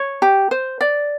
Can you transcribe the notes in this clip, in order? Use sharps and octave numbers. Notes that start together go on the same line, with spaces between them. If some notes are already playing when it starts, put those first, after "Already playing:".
Already playing: C#5
G4
C5
D5